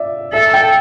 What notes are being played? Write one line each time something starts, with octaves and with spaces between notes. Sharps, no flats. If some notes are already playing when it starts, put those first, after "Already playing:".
Already playing: D5 E5
A4 E5
G5